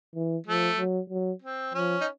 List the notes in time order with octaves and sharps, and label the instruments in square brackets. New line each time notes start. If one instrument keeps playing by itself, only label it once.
[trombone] E3
[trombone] F3 [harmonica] A3
[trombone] F#3
F#3
[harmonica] C4
[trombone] F3 [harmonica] C#4
[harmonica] D#4